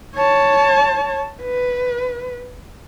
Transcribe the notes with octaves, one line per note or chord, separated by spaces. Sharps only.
C#5 A5
B4